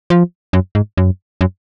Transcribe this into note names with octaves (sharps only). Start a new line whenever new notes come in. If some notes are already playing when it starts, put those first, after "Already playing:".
F3
F#2
G#2
F#2
F#2